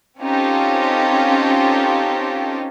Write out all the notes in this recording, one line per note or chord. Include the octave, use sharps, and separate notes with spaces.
C4 C#4 D#4 F4 G4 A4